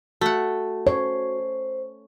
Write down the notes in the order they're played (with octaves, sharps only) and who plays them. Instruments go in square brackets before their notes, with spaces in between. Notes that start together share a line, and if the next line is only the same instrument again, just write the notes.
[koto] A3 F#5 [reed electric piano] F#4
[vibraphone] C5 [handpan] C#5